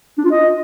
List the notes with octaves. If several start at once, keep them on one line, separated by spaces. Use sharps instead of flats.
D4
F4
D#5